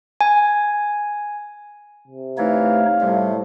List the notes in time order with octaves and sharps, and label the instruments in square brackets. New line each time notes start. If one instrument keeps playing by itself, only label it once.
[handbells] G#5
[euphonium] C3
[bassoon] E3 [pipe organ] A3 D#4 C#5 [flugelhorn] F5
[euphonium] A2 [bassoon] C3 [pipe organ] G3